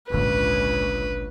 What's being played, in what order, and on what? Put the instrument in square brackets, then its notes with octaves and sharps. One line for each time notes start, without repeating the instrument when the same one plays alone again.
[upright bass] G#1 D3 [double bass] C#2 A#2 [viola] B4